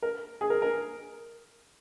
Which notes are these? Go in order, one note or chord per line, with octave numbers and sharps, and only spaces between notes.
A#4
G#4
A#4
A#4